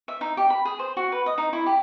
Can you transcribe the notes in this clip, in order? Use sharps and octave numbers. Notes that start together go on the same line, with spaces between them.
E5
D#4
G4
B5
G#4
C5
F#4
B4
D#5
D#4
E4
G4